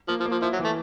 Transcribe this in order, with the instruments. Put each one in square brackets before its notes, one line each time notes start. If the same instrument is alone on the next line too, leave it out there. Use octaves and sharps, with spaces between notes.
[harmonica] F3 [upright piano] A#3
[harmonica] F3
[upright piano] A#3
[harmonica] F3
[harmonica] F3 [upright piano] E4
[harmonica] F#3
[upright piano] E3
[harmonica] A3